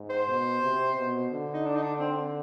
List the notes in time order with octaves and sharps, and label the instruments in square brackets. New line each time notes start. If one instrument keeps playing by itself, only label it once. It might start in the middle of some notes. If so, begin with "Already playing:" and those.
Already playing: [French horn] G#2
[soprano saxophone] C5
[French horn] B2
C3
B2
D3
[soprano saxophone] D#4
D4
D#4
D4
C4